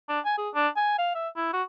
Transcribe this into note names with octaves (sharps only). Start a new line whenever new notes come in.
D4
G#5
G#4
D4
G#5
F5
E5
E4
F#4